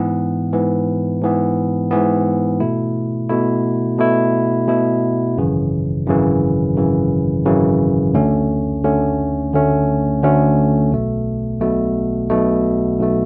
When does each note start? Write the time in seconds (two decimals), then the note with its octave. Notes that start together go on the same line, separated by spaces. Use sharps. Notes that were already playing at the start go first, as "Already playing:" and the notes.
Already playing: G#2 E3 B3
0.52 G#2 E3 B3
1.22 G#2 E3 B3
1.91 G#2 E3 B3
2.60 B2 A3 E4
3.29 B2 A3 E4
3.98 B2 A3 E4
4.68 B2 A3 E4
5.38 G#1 F#2 C#3 E3
6.06 G#1 F#2 C#3 E3
6.75 G#1 F#2 C#3 E3
7.45 G#1 F#2 C#3 E3
8.14 D2 D3 A3 C#4
8.83 D2 D3 A3 C#4
9.53 D2 D3 A3 C#4
10.23 D2 D3 A3 C#4
10.92 B1 B2 A3
11.61 B1 B2 A3
12.30 B1 B2 A3
12.99 B1 B2 A3